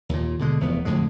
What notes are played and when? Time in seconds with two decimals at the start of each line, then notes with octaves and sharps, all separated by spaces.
0.09 D#2 A#2
0.39 B2 D3 G#3
0.60 F1 E2 B3
0.85 F2 A2 D3 G#3